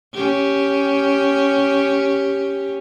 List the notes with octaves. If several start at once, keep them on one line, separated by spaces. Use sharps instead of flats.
C#4 G4